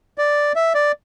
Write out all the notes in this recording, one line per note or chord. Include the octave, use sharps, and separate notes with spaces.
D5
E5
D5